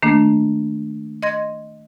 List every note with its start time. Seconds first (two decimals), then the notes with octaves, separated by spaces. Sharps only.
0.02 D#3 A3 A#3 D4
1.23 D#5 C6 G#6 A#6